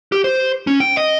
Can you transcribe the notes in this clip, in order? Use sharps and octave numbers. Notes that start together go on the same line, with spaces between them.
G4
C5
C#4
G5
D#5